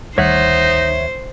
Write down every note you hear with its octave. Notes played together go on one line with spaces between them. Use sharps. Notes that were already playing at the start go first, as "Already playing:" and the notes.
D2 D#3 G3 D#4 C5 C#5 E5 F#5